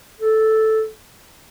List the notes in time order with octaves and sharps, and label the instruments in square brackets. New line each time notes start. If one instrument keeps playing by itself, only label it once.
[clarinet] A4